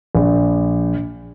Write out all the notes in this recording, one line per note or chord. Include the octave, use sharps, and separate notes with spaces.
A#1